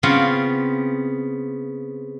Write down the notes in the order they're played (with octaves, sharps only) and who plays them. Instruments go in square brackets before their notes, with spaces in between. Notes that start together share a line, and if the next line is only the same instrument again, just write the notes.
[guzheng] C#3 B3 C4 F4